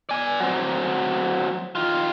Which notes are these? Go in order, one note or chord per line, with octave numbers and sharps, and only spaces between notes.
D5 G#5
F#3 C4
D#3 F4